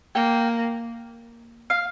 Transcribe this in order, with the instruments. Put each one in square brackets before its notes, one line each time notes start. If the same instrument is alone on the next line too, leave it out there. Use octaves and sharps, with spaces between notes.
[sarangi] A#3 [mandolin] G5
[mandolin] F5